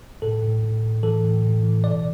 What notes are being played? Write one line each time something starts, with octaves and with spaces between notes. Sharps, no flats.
A2 A4
A2
A2
A2
E3 A4
A2
A2
E3
B2 D5